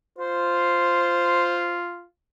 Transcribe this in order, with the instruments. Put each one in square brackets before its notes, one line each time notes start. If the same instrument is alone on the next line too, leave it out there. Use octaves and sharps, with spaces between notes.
[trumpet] F4 [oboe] C5